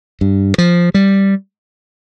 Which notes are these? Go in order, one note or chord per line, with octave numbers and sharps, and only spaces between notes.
G2
F3
G3